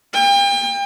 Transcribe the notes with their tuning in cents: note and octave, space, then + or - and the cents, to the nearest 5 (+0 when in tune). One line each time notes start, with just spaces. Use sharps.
G5 +35